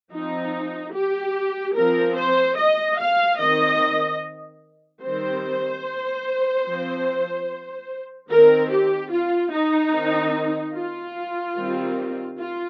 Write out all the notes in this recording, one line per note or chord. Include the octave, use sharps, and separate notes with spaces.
F3 C4 D#4
G4
F3 C4 A#4
C5
D#5
F5
D#3 C4 D#5
D#3 G3 C4 C5
F3 C4
D#3 C4 A#4
G4
F4
D#4
D#3 C4
F4
D#3 G3 C4
F4